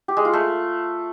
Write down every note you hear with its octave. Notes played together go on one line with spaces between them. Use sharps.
G4
G#3
F4
A3